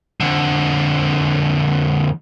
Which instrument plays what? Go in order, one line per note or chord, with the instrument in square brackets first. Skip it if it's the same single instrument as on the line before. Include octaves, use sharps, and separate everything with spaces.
[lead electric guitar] F2 D3